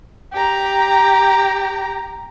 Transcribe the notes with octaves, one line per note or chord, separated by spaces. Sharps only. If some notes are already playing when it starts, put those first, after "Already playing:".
G4 A#5